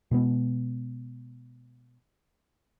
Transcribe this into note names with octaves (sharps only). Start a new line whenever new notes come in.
B2 G#3 B3